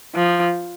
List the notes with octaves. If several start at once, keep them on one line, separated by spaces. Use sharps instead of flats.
F3